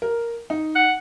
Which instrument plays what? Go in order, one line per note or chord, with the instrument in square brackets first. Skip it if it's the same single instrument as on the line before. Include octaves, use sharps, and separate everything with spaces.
[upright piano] A#4
D#4
[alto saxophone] F#5